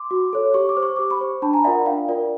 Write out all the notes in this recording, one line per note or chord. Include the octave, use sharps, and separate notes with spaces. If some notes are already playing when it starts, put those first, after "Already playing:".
Already playing: C6 D6
F#4
A4 C#5
G4 C#6
D6
C5
C#6
G4 D6
B5 C#6
C5
D4 A5 B5
G#5 A#5
F4 A#4 D5 E5 F#5
D4 F5 G5
F4 A#4 D5